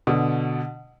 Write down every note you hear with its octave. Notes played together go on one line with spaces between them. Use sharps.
B2 D3